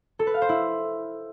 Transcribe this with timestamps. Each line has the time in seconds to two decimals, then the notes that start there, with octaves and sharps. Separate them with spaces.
0.19 A4
0.27 B4
0.34 F5
0.42 C5
0.49 E4